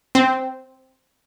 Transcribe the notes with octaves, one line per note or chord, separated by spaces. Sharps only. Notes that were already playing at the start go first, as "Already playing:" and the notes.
C4